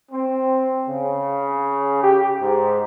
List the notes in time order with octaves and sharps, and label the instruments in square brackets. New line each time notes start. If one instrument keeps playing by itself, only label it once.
[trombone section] C4
C#3
G4
G#2